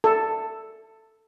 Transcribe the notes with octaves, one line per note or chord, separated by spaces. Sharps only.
A4